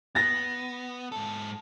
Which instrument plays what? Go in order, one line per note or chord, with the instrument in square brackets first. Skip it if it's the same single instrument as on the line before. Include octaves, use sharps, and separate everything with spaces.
[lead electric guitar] B3 [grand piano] A6 A#6
[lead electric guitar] G#2 A4